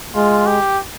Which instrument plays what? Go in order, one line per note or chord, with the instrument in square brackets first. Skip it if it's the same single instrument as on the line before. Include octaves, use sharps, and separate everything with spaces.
[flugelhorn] G#3 [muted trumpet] F4
[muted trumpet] G4